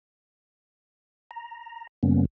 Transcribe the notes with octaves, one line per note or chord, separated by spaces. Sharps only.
A#5
F#2 C#3 G3 A#3 B3 C#4